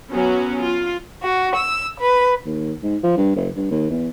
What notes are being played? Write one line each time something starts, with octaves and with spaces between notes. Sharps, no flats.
F#3 B3 C#4 F#4
F4
F#4
E6
B4
D#2
G#2
F3
G2
F#1
G2
D#2
E2